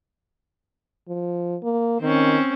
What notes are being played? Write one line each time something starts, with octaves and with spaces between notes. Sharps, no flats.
F3
A#3
D#3 C4 C#4